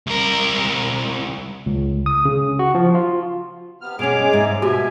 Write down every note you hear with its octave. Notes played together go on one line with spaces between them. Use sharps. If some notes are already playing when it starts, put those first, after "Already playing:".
C2 A#4
C#2
D#6
C#3
F#4
F3
F4
C3 B3 F6
B2 G#3 C#4 G#4 D6 D7 F7
G#2 C3
B2 F#4 G4 E5 G#5